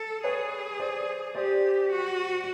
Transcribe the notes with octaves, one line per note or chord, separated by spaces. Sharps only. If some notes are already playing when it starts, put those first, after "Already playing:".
Already playing: A4
G#4 B4 C#5
C5 D5
G4 C5 D5
F#4